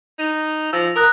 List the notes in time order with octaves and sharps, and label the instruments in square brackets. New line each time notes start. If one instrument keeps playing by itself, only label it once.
[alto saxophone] D#4
[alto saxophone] F3 [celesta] E6 A#6 F7
[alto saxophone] A#4 [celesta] A#5 D#6 F#6